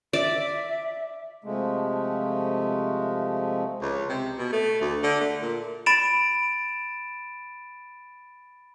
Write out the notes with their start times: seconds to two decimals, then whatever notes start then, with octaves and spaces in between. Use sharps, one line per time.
0.13 D5 E5
1.44 C3 F3 G#3 A3
3.82 C#2
4.09 C3
4.38 B2
4.52 A3
4.81 D2
5.03 D3
5.21 A3
5.42 A#2
5.86 B5 A6 D7 E7